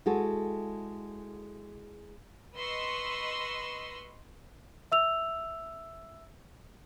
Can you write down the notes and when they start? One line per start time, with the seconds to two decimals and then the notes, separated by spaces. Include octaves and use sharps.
0.06 G#3 E4 F#4 G#4 A4
2.57 B4 D#5 C6 C#6 E6
4.92 E5 E6 F7